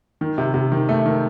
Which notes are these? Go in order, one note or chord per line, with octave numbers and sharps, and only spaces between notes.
D#3
C3
C3
D#3
A3
D#3